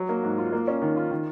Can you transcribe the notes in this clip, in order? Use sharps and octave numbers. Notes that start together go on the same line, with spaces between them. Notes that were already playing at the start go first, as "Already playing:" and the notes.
Already playing: F#3
A#3
G#2
F4
A#3
C#4
D#3
F4
D#3